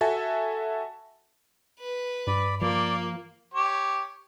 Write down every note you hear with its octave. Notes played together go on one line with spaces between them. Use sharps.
F#4 A4 E5 G#5 A5
B4
G2 D5 B5
F3 A#3 D5
G4 C#5